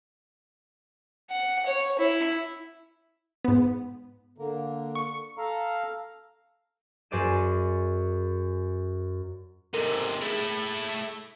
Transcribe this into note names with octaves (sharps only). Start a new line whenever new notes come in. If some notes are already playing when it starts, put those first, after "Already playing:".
F#5
C#5
E4
G#2 B3
D3 A#3
C#6
A4 F5 A#5
F#2 G#4 C5 D5 D#7 E7
G#2 C3 A4 A#4
A3 E4 G#4